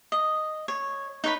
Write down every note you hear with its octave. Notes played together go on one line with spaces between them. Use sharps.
D#5
C#5
D#4 B4 C#5 B5